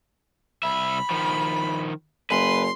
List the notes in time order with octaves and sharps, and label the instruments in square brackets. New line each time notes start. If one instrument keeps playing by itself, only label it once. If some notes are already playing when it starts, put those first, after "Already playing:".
[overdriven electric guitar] C2 E5 [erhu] B5
[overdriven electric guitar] D#3 F3
[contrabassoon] F#1 [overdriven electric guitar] B4 [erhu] C6